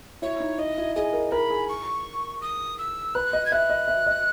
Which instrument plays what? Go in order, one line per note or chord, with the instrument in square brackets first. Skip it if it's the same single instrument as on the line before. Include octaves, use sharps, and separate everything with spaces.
[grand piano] E4 [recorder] C#5
[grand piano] D#4
[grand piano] E4 [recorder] D#5
[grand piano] E4
[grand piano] G#4 [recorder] D#5
[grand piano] A#4
[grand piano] A#4 [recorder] B5
[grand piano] G#4
[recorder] C#6
D#6
E6
[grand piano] B4 [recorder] F#6
[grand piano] D#5
[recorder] G#6
[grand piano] E5 [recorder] F#6
[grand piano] D#5
E5
D#5